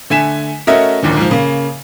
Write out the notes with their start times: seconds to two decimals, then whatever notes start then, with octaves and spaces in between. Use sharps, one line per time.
0.10 D3 A3 G#5 B6 E7
0.67 A3 C#4 F#4 A#4 D#5 E5
1.03 F#1 D#2 A#2 D3
1.17 G#2 F3
1.30 C#3 A#3